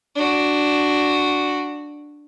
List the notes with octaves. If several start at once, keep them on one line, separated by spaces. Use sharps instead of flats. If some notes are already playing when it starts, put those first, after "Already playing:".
D4 F#4